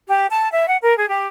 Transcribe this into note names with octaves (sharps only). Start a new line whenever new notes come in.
G4
A5
E5
F#5
A#4
G#4
G4